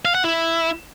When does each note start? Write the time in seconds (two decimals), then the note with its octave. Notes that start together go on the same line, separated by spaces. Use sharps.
0.05 F5
0.15 F#5
0.24 E4